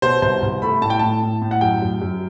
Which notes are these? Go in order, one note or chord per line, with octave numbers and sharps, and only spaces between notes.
B2 C5
C2 C5
C2
A3 B5
A2 A5
G5
A2 A5
A2
A2
F#5
F#2 G5
F#2
F#2